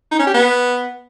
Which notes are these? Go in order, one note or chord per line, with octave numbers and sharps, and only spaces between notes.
D#4
C#4
G4
B3